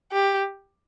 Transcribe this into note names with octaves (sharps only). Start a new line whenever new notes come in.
G4